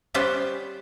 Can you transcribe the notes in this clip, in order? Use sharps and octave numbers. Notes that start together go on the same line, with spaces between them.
G3 B3 C#4 G4 C5 G5